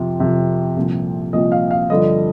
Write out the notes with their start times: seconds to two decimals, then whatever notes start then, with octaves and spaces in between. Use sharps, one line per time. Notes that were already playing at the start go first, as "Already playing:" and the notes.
Already playing: F2 C3 F3
0.19 F2 C3 F3
0.76 C2 A#2 F3
1.33 C2 A#2 F3 D#5
1.52 F5
1.71 F5
1.90 G2 D3 F3 D#5